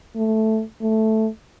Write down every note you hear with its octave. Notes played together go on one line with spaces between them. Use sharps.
A3
A3